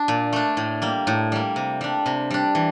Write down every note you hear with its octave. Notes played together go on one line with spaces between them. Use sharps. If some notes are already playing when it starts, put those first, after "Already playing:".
Already playing: D4
A#2
A3 D4
A2
G3 A#3
A2
G3 A#3
C3
G3 D4
C3
G3 D4
E3